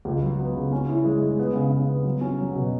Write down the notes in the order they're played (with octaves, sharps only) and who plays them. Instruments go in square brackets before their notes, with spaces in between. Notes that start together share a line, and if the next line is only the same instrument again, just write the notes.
[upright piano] C#2
F#3
B3
C#3
C#4
E4
G#3
G#3
B3
C#3
C#3
B3
F#3
C#4
F#3
B2